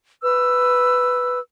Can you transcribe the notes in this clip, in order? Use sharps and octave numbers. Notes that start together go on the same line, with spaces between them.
B4 E6